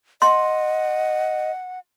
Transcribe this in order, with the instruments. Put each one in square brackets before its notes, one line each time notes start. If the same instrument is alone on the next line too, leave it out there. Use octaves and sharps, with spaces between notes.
[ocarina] D#5 [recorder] F#5 [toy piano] C6